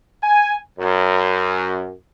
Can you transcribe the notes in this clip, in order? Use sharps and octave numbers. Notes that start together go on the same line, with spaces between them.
G#5
F#2